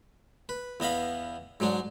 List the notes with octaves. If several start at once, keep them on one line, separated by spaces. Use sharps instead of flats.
B4
E2 B3 D#5 F5 B5
G#2 F#3 G#3 D4